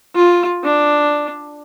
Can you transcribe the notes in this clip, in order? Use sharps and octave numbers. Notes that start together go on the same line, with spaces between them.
F4
D4